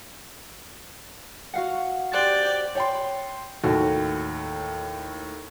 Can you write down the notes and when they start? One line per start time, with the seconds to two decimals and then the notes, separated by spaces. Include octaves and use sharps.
1.54 F#4 F5 F#5
2.12 G4 C5 D5 G5 F#6 A6
2.75 C#5 G5 C6
3.64 D#2 A2 F#4 A4